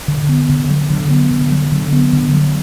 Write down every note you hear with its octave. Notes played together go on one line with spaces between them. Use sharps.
D3
B3
D3
F#3
D3
B3
D3
F#3
D3
B3
D3
F#3